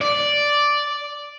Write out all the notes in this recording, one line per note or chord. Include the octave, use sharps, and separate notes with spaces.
D5